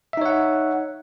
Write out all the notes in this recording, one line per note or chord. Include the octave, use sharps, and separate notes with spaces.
D#4 C#5 E5 F#5